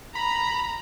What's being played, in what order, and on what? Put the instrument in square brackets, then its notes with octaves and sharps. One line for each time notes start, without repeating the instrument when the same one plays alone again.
[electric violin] A#5 [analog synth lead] B5